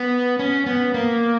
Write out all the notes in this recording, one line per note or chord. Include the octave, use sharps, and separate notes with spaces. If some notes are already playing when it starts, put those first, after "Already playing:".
Already playing: B3
C#4
B3
A#3